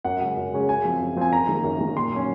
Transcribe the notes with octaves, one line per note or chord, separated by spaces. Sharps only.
F#2 F#5
C#3 G#3 C#4
F#2
C#3 G#3 C#4
F#2 G#5
F3 C4
F#2
F3 C4 G#5
F#2 A#5
D#3 A#3
F#2
D#3 A#3
A#2 C6
F#3 C#4